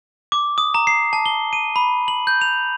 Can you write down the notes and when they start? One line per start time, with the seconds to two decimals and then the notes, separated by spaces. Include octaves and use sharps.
0.32 D6
0.58 D#6
0.74 A#5
0.87 C7
1.13 A5
1.26 G7
1.53 D#7
1.76 B5
2.08 F#7
2.27 G6
2.41 F7